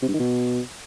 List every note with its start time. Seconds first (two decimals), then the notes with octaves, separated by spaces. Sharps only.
0.02 C3
0.08 G2
0.14 D#3
0.20 B2